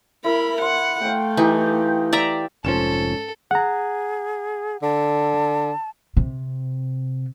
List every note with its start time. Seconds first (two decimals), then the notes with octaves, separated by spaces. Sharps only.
0.24 E4 A#4 B5
0.61 F#5 C6
1.02 A3 F5 G5
1.37 E3 D#4 G4
2.13 D5 E5 A#5 E6
2.65 F1 G#2 F3 C#4 A4 E7
3.51 G#4 F#5 A#5
4.82 D3 A5
6.17 C3